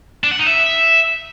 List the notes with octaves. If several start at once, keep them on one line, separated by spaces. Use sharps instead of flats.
D4
F#5
D#4
E5